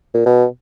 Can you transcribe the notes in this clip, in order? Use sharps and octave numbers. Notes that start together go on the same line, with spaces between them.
A#2
B2